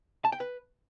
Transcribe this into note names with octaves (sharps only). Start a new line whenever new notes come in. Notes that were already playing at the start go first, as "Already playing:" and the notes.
A5
G5
B4